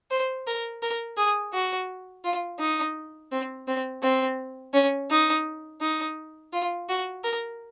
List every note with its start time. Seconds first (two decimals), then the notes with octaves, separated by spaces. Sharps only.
0.11 C5
0.47 A#4
0.82 A#4
1.17 G#4
1.53 F#4
2.24 F4
2.60 D#4
3.32 C4
3.68 C4
4.03 C4
4.74 C#4
5.11 D#4
5.81 D#4
6.53 F4
6.89 F#4
7.24 A#4